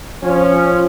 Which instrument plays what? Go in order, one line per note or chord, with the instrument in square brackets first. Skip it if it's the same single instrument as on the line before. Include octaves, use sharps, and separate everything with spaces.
[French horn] F3 [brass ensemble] C#4